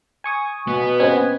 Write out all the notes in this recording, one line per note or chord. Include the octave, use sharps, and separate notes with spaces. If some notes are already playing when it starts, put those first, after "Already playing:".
G#5 C#6 D#6
B2 B3
C4 C#4 B4 C5 D#5 G#6